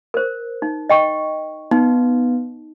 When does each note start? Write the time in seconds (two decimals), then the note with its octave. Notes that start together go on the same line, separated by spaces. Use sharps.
0.14 A#4 C5
0.62 D#4
0.90 D#5 G5 C#6
1.71 B3 D#4